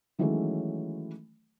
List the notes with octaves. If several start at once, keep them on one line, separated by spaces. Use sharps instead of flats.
D#3 E3 F#3 G#3 A3 C#4